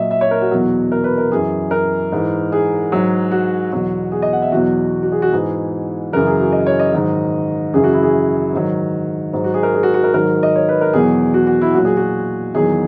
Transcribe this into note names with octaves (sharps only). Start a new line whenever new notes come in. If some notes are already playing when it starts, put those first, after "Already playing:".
Already playing: A#2 F#3 D#5 E5
E5
C#5
A#4
F#4
E2 B2 F#3
A#4
B4
A#4
F#2 E3 G#4
A#4
G#2 E3
G#4
G#2 F#3
F#4
E2 B2 F#3 F#4
G#4
D#5
F#5
E5
E2 B2 F#3 F#4
F#4
G#4
F#4
G#2 E3 G#4
F#2 C#3 E3 A#4
G#4
F#4
D#5
C#5
D#5
G#2 D#3 F#3
F#2 C#3 E3 G#4
F#4
E4
G#4
G#2 D#3 F#3
G#2 F#3
F#4
G#4
A#4
G#4
F#4
F#4
A#4
G#2 D#3 F#3 A#4
D#5
C#5
B4
A#4
E2 B2 F#3 G#4
F#4
F#4
E4
A#2 F#3 F#4
G#4
F#4
E2 D#3 F#3 G#4